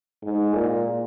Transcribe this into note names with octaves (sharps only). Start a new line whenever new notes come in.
G#2
A#2